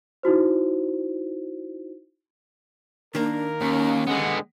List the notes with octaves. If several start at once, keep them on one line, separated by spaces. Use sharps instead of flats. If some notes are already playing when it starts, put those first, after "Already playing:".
D#4 E4 F#4 C5
D#3 A#3 D4 A#4
D#2 C#4
D3 G#3 B3